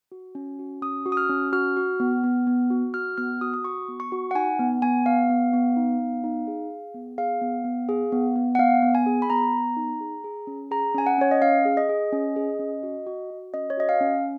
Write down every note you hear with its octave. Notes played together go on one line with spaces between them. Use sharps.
F#4
C#4
F#4
C#4 D#6
F#4
D#6
F6
C#4
F#4 F6
F#4
B3
B3
B3
F#4
F#4 F6
B3 F6
F#4 D#6
D#6
F#4 C#6
B3
C#6
F#4
F#5
D#4 G#5
B3
B3 G#5
B3 F5
B3
B3
D#4
B3
D#4
G#4
G#4
B3
G#4 F5
B3
B3
G#4
B3
B3
F#5
B3 F5
B3
G#5
G#4
B5
B3 A#5
B3
D#4
G#4
G#4
C#4
G#4 A#5
C#4 G#5
F#5
C#4 C#5
D#5
C#4 F5
G#4
D#5
G#4
C#4
G#4
C#4
F#4
F#4
F#4
C#4 D#5
C#5
F#4 D#5
F5
C#4